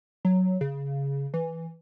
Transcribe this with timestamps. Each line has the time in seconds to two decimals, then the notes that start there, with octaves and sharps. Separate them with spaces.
0.25 F#3
0.61 C#3
1.34 E3